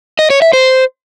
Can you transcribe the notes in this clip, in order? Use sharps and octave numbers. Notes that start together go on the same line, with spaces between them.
D#5
C#5
E5
C5